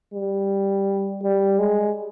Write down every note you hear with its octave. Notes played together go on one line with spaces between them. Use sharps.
G3
G3
G#3